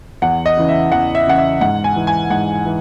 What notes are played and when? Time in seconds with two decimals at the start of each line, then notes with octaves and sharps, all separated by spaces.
0.22 E2 F#5
0.46 D#5
0.57 C#3 E3
0.69 E5
0.92 E2 F#5
1.15 E5
1.27 C#3 E3 F#5
1.38 E5
1.61 G#2 F#5
1.84 G#5
1.96 E3
2.07 G#5
2.30 G#2 F#5
2.65 E3